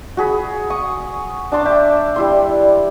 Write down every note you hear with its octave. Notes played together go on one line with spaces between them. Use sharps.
F#4 G#4 B5
C#6 D#6
D4 A5 C6 D6
E5 G5
G3 E4 C6